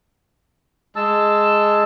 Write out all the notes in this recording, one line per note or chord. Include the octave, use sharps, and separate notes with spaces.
G#3 A5 E6